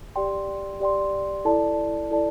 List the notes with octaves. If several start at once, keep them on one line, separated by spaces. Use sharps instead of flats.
G4 D5 G5 C6
G4 D5 G5 C6
E4 A4 D5 A5
E4 A4 D5 A5